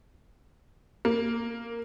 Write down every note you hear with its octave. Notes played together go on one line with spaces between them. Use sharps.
A#3